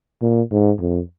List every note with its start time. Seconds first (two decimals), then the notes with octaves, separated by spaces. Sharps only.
0.22 A#2
0.51 G#2
0.80 F2